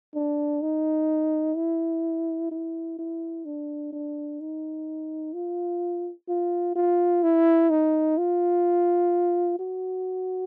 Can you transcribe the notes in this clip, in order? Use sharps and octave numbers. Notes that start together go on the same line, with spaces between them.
D4
D#4
E4
E4
E4
D4
D4
D#4
F4
F4
F4
E4
D#4
F4
F#4